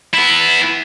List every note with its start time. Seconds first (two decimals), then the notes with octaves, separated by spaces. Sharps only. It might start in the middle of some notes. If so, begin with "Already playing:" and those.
0.13 B3 E4